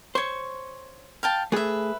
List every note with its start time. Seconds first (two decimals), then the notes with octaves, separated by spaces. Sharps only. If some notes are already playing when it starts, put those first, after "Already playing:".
0.15 C5 C#5 C#6
1.23 F5 G5 A5
1.52 A3 G#4 B4 E5